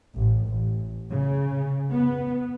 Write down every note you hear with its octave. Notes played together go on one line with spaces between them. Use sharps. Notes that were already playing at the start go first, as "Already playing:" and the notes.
A1
A1
C#3
B3